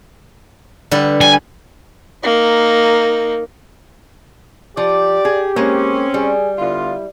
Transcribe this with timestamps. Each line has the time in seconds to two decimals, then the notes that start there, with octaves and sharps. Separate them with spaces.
0.91 D3 G3 B4
1.21 G3 G#5
2.23 A#3 D#4
4.77 F3 G4 D5
5.25 G#4
5.56 G#3 A#3 C4 C#4
6.14 G3 G#4
6.59 D3 B3 E4 F4